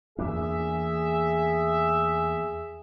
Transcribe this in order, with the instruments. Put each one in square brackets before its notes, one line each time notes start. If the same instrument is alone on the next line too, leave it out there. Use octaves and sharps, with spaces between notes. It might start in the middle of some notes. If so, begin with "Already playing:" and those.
[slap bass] E2 A#3 D4 [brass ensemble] G#4 E5